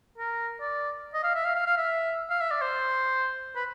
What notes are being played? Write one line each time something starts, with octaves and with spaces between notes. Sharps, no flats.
A#4
D5
D#5
F5
E5
F5
F5
F5
E5
F5
E5
D5
C5
B4